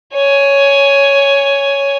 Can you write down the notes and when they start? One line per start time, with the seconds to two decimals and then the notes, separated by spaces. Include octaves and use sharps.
0.14 C#5 G#5